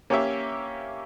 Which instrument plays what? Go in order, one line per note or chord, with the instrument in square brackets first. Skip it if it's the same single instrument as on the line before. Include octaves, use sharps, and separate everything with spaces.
[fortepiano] A#3 C#4 G4 C#5 E5